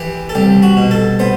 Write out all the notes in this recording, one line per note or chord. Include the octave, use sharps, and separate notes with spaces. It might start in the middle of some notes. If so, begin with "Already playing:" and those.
Already playing: E3 G4
A4
C2 G4
F#4
B2
A4
B3 C5